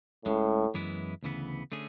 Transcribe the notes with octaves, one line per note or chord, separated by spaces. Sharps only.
C#2 A2 C#3 G#3
F#2 E3 G#3 B3 E4
D2 C#3 E3 B3
D3 A3 C#4 G#4